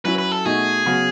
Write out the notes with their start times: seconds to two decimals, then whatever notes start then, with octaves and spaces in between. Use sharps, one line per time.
0.05 F#3 C#4 E4 B4
0.18 B4
0.32 A4
0.45 B2 A3 D#4 F#4 G#4
0.86 C#3 F#3 B3 F#4